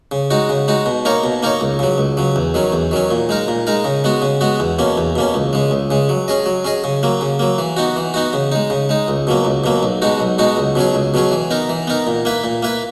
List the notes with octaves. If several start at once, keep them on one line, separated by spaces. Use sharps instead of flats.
C#3
G#3 D#4 F#4
C#3
G#3 D#4 F#4
B2
A#3 D#4 A#4 C#5
B2
A#3 D#4 A#4 C#5
C#2
C#3 F#3
C#2
C#3 F#3
E2
D#3 F#3 C#4
E2
D#3 F#3 C#4
A#2
G#3 D#4 A#4
A#2
G#3 D#4 A#4
C#3
G#3 B3 F#4
C#3
G#3 B3 F#4
E2
B2 A#3 C#4
E2
B2 A#3 C#4
C#2
C#3 G#3
C#2
C#3 G#3
F#3
C#4 G#4 D#5
F#3
C#4 G#4 D#5
C#3
F#3 A#3
C#3
F#3 A#3
E3
B3 D#4 F#4
E3
B3 D#4 F#4
C#3
G#3 D#4
C#3
G#3 D#4
C#2
B2 F#3 A#3
C#2
B2 F#3 A#3
B1
B2 G#3 D#4 F#4
B1
B2 G#3 D#4 F#4
C#2
B2 F#3 C#4 G#4
C#2
B2 F#3 C#4 G#4
E3
B3 D#4 A#4
E3
B3 D#4 A#4
A#2
A#3 E4 B4
A#2
A#3 E4 B4